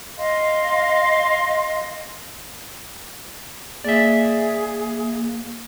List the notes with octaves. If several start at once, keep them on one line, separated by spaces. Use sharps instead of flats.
D#5 F5 C6
A#3 G#4 D5 E5